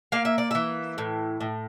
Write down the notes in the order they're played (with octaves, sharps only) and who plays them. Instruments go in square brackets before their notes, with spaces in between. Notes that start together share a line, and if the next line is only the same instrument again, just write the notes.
[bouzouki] A#3 F5
E5
D5
E3 E5
A2
A2